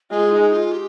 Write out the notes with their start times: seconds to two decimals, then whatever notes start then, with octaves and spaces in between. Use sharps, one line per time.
0.11 G#3 F4
0.31 D#4
0.52 F4
0.72 G4